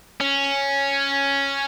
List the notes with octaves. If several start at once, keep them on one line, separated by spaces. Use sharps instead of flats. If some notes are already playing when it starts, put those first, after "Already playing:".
C#4